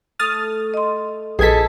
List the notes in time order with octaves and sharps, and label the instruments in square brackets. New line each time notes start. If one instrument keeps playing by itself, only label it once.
[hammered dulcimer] A3 A4 [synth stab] D#6 F6 A6
[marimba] D#5 C6
[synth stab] A#1 G#6 B6 [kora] G#4 A4 [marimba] B4 D#5